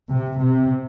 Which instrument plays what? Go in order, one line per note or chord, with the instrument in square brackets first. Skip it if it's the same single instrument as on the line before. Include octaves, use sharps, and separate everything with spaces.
[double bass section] C3
C3